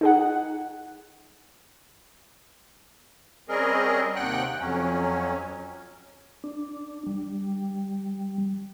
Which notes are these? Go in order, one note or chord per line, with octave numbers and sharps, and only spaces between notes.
D#4 G#4 F#5
G3 C4 C#4 G#4 A#4 D#5
D#2 C3 F#5 G5 F#6
F2 F#3 C#4
D4
G3